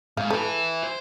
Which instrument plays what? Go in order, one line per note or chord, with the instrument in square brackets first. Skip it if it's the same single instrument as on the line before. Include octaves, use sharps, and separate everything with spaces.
[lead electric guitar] G#2 [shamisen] F5
[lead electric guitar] E4 B4 [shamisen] A4
[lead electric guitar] C5